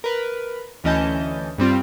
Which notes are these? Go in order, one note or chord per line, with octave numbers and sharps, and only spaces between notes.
A#4 B4
D2 E3 C#4 D#5 A5 G6
G2 G3 C4 F4